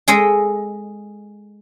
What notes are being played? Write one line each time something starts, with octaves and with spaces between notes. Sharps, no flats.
G#3 G#4 A4 D#5